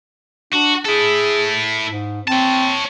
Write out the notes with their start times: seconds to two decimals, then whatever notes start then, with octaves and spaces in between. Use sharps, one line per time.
0.53 D4 F#4
0.85 E4 G#4 A4
1.88 G#2
2.28 C4 C#5 A5